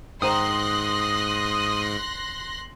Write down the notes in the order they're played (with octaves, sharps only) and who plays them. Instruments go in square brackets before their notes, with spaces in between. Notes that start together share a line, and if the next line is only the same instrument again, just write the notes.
[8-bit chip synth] G#2 [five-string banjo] D#3 C5 A#5 [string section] C6 F#6 A#6 [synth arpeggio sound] D#6